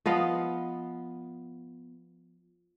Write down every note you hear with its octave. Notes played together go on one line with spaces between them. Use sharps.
F3 B3 D#5 F5